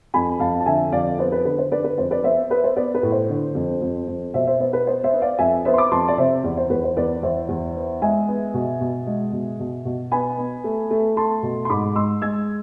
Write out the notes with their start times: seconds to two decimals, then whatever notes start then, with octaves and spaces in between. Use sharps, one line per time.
0.14 F2 G#5 B5
0.40 F2 F5 A5
0.60 A5
0.66 D3 E5 G#5
0.92 F2 D5 F5
1.19 B3 C5
1.32 B4
1.45 D3 B4
1.58 C5
1.72 D3 B4 D5
1.84 B4
1.98 F2 C5
2.11 B4 D5
2.24 B3 C5 E5
2.50 B3 B4
2.64 C5
2.76 B3 B4 D5
2.94 B4
3.03 A2
3.12 C5
3.29 D3
3.55 F2
3.82 F2
4.08 F2
4.34 B2 C5 E5
4.47 C5 E5
4.60 B3 C5
4.73 B4
4.87 B3 C5
5.04 C5 E5
5.13 B3
5.22 D5 F5
5.39 F2 E5 G#5
5.65 B3 C5 E5
5.74 C6
5.78 B5 D6
5.91 F2 A5 C6
6.08 D5
6.18 C3 C5 E5
6.44 E2 D5
6.57 C5
6.70 E2 B4
6.84 C5
6.96 E2 B4 D5
7.23 E2 C5 E5
7.49 E2
7.75 B3
8.02 G#3 E5 G#5
8.28 B3
8.54 B2
8.81 B2
9.07 G#3
9.33 B2
9.60 B2
9.85 B2
10.12 B3 G#5 B5
10.38 B3
10.64 A3
10.91 A3
11.17 A3 A5 C6
11.43 B2
11.65 C6
11.69 G#2 B5 D6
11.96 G#3 C6 E6
12.22 G#3 E6 G#6